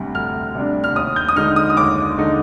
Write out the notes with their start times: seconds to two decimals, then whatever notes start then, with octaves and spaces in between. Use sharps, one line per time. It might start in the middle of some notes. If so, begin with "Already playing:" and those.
Already playing: D2 C3 G3 D4
0.14 D2 F6
0.55 C3 G3 D4
0.84 F6
0.96 D#2 D#6
1.16 G6
1.29 D#6
1.36 D3 G#3 D#4 F6
1.56 D#6
1.70 D#6
1.77 D#2 D6
2.18 D3 G#3 D#4